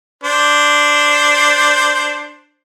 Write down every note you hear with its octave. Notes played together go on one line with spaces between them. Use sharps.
D4 C5